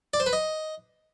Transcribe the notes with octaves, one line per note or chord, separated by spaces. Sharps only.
D5
C5
B4
D#5